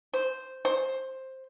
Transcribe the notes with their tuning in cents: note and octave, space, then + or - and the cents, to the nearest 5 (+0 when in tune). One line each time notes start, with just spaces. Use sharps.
C5 -5
C5 +10